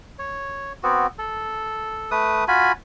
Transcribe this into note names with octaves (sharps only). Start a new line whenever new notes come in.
C#5
B3 C4 F#4
A4
A3 B4 D#6
F4 F#4 G#5 B5